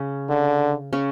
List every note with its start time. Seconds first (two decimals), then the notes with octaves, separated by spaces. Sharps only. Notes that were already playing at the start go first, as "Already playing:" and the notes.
Already playing: C#3 C#4
0.30 D3
0.93 C#3 C#4